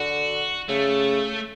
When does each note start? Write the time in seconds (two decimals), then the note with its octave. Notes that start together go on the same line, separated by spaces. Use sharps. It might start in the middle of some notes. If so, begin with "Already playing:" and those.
Already playing: D3 F#4
0.68 C#3 A3